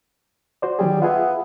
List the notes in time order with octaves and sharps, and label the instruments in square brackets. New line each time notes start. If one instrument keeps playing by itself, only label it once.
[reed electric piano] F#4 C5 D5
[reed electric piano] D#3 F#3 G#4 [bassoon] G3
[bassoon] B3 [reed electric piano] F4 G#4 E5